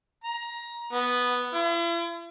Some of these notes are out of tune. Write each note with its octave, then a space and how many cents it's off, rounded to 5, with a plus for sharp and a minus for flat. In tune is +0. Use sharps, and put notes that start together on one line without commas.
A#5 +20
B3 +0
E4 +45